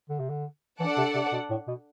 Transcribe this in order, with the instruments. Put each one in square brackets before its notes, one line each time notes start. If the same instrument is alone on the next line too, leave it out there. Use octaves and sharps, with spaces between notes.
[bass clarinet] D3
C3
D3
[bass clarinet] E3 [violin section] D4 A4 D5 F#5 A5
[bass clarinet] C3
C3
B2
A2
B2